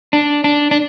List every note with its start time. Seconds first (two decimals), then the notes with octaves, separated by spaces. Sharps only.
0.13 D4
0.44 D4
0.71 D4